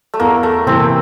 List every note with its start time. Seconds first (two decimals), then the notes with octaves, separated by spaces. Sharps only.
0.14 A3
0.20 E2 A#3
0.43 A3
0.66 C3 E3 A#3 C4